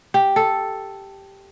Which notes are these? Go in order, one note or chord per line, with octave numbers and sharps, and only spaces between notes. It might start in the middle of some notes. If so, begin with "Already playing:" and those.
G4
A4